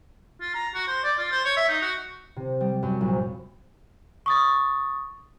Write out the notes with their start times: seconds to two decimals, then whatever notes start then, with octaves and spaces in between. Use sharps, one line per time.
0.41 F4
0.54 A#5
0.74 F#4
0.88 C5
1.04 D5
1.18 F4
1.31 C5
1.45 C#5
1.56 E5
1.68 D#4
1.82 F#4
2.36 C3
2.61 G3
2.83 F#2
3.01 A#1
4.26 C#6 D#6 A6